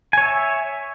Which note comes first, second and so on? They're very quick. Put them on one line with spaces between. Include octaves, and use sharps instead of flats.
G#5 C#5 E5